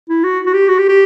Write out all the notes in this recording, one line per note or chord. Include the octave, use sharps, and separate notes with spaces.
E4
F#4
F#4
G4
F#4
G4
G4